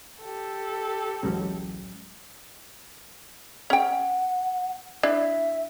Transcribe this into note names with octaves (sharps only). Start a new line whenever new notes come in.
G4 A4
A1 D2 E3 F#3 G#3 C#4
C#4 F#5 G5
D4 E4 E5